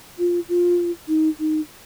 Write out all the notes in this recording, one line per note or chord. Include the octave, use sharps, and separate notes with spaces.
F4
F4
D#4
D#4